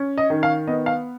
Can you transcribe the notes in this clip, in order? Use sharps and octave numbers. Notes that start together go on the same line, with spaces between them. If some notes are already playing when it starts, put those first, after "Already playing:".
Already playing: C#4
D#5
D#3
F5
B3 D#5
F5